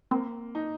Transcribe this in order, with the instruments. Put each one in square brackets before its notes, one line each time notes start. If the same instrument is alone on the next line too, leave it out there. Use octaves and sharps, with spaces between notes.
[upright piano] A#3 [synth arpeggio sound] C4
[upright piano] D#4